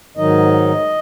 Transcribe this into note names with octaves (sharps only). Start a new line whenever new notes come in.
G#2 D#3 F#3 D#4 D#5